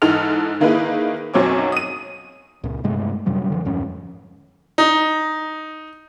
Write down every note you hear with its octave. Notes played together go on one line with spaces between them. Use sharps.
G#2 E3 D#4 A4 F6 F7
D#3 A#3 D#4 E4 G#4 B4
B1 F#2 F#3 C4 C#5 D6
D#6 D#7
C#2 A#2
G2 C3 G#3 A3
F#2 C3 F#3 G3
D3 E3 F3
D1 F2 G#2 C#4
D#4